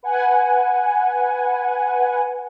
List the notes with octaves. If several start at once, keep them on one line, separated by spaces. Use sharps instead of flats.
B4 F#5 G#5